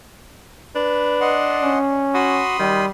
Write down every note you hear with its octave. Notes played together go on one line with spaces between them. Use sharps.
D4 B4
D#5 F#5 C6
C#4
F#4 B5 C6 D#6
D#3 G3